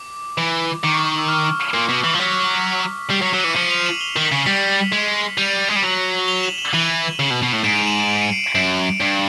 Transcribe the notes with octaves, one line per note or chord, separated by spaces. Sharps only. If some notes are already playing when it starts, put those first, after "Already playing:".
Already playing: D6
E3
D#3 D6
C#6
E6
F6
A#2
B2
E3
F3
F#3 B6
G3 C7
F#3
B6 C#7
F#3 E7
E3 C#7 D#7
F3 C#7 D#7
D#7 F7
E7 F#7
F7 G7
D#3 E7 F#7
B6
C#3 C7
G3 B6 C#7
G#3
G3 D#7 F7
G#3
G3
F#3
F7 G7
E7 F#7
E7 F#7
F#7
E3 D#7 F7
C#3
B2
B2
A2
G#2 D7 E7
D#7 F7
E7 F#7
E7 F#7
D#7 F7
C#7 D#7
C7 D7
D7 E7
F#2 D7 E7
G2